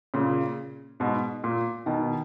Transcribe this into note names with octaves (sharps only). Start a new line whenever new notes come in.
A#2 C#3
G#2 B2
A#2
B2 D#3